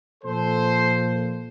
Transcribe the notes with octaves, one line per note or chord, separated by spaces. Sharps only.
A#2 F3 A4 C5